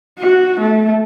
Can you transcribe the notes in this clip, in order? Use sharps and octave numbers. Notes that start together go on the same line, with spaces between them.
F#4
A3